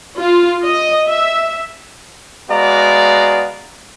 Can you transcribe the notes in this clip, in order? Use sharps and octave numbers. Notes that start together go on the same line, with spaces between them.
F4
D#5
E5
G#3 B3 F#4 D5 F5 A#5